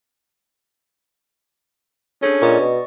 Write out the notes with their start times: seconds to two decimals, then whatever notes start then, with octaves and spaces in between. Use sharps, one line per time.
2.23 C#4 D4 G#4 A4
2.42 A#2 D5 D#5 C#6
2.60 B2